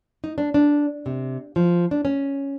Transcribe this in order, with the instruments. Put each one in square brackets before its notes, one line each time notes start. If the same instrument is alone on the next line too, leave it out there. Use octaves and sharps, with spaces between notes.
[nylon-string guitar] D#4
D4
D4
C3
F3
D4
C#4